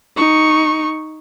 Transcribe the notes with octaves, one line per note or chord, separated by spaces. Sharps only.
D#4 C#6